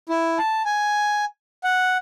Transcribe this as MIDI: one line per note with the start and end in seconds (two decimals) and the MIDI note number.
0.09 0.38 64
0.38 0.62 81
0.65 1.25 80
1.64 1.97 78